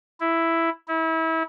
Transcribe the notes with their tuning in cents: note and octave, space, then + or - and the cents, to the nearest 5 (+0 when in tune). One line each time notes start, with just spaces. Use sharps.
E4 +5
E4 -30